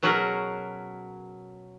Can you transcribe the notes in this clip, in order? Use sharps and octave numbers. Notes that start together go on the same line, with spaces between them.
B2 F#3 C#4 F#4 G#4 A#4